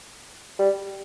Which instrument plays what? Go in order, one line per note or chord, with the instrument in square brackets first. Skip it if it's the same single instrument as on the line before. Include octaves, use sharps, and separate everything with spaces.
[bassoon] G3